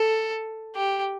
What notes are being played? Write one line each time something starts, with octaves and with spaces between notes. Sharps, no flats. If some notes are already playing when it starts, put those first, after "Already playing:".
Already playing: A4
G4